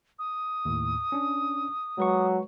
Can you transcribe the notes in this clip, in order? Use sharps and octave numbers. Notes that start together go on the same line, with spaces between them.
D#6
D#2 A2
C#4 D4
F#3 G#3 B4 C#6